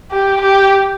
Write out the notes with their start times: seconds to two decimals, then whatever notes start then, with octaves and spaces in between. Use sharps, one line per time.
0.11 G4
0.41 G4